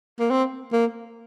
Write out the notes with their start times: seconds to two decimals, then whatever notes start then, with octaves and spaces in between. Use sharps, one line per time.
0.19 A#3
0.31 C4
0.73 A#3